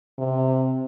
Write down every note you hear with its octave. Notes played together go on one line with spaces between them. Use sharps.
C3